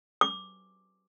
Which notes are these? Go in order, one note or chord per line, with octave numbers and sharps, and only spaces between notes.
D6